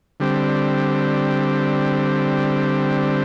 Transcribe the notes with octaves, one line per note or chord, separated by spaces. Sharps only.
D3 G3 C4